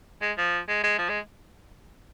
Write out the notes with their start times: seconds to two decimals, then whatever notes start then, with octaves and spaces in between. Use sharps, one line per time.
0.21 G#3
0.38 F3
0.68 G#3
0.84 G#3
0.98 F3
1.09 G#3